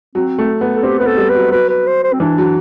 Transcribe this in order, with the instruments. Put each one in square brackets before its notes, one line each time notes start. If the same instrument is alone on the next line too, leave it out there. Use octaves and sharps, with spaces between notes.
[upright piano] F#3 [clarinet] C4
[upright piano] A3
B3
[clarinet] A4
[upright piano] C4 [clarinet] G4
[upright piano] B3 [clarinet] B4
[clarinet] A4
[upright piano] G3
[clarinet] B4
[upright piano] F#3
[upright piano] F#3 [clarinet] B4
[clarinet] B4
C5
C5
C4
[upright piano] E3 [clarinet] D4
[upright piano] F#3